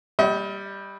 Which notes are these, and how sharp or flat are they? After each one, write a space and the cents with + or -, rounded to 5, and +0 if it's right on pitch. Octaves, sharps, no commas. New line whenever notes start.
G3 +5 D#5 +40 F#5 +40